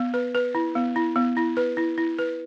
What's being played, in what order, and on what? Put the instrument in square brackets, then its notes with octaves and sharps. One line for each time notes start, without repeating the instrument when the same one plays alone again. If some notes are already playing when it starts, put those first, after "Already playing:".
Already playing: [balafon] B3
B4
B4
E4
B3
E4
B3
E4
B4
E4
E4
B4